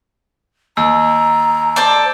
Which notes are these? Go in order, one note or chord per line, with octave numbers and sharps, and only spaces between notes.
D#2 A#5 E6
A4 C5 D5